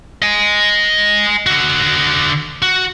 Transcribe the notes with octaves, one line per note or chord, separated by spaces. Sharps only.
D#5 G#5
D3 F#4
F#4